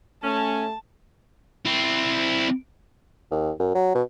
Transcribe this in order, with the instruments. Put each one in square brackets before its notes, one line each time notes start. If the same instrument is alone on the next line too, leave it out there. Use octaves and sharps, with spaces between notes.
[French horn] A3 [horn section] C#4 [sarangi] A5
[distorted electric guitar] C4 E4
[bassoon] D#2
F#2
F#3
B2